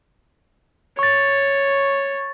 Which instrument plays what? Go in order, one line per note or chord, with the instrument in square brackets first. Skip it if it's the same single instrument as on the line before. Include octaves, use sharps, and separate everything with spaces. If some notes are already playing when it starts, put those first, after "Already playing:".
[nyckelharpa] C#5 [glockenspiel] C#6 A6